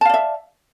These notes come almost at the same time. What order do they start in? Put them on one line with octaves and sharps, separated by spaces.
A5 F5 D5 E5